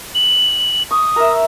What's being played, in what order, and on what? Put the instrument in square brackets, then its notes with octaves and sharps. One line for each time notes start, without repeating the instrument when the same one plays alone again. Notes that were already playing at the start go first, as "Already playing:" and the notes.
[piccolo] F#7
[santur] C#6 [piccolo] D#6
[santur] A#4 E5